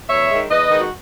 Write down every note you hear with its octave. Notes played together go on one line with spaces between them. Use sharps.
E2 C#5 E5
D#3 G#3
E2 B4 D#5
D#3 G#3
F#4